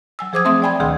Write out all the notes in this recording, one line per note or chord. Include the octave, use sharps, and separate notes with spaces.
F#3 G#5 E6
F3 G#4 C5 D6 D#6 G#6
A3 C4 E5 C6 D#6
D5 G5 G#5 B5 G#6
D2 B2 D#3 G#4 C6 E6